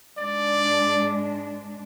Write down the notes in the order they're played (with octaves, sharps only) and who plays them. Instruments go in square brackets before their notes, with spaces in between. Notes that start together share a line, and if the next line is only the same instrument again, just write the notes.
[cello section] G#2 G#3 D4 [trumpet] D5